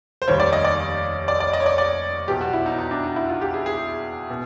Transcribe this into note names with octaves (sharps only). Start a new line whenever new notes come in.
C5
F1 D#2 D#3 G3 C#5
D5
D#5
D5
D5
D5
D#5
C#5
D5
D5
E2 B2 F#3 G4
F#4
E4
D#4
D#4
D4
D#4
E4
F4
G4
G#4
G#4
B2